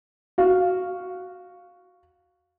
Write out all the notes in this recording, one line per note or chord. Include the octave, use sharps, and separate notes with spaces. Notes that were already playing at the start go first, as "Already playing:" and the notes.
F#4 F5